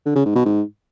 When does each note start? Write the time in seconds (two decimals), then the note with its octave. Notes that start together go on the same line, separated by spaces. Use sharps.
0.06 D3
0.16 C#3
0.26 G#2
0.35 B2
0.45 G#2